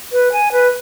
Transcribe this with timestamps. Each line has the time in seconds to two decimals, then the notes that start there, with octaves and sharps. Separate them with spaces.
0.12 B4
0.32 G#5
0.52 B4